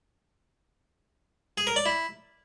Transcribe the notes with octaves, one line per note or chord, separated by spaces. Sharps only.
G#4
A#4
D5
E4